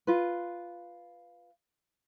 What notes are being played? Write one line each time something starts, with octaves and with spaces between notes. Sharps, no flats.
F4 B4